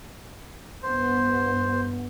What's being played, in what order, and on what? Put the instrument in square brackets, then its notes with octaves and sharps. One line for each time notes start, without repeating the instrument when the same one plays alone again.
[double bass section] G2 B3 [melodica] C5